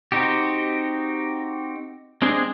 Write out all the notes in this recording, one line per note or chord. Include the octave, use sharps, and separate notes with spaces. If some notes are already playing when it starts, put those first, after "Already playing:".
C4 D#4 F#4 G4
G#3 C4 D4 G#4 D#5